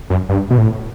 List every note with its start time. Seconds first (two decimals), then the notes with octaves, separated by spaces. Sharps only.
0.10 F#2
0.29 G2
0.51 B2
0.58 A2